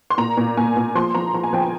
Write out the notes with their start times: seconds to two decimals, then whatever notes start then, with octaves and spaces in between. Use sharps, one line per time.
0.10 C6
0.18 A#2 A#5
0.37 A#2
0.57 A#2 G#5
0.77 A#2
0.95 F3 C6
1.15 F3 A#5
1.34 F3 A#5
1.43 G#5
1.53 F3 G5
1.63 G#5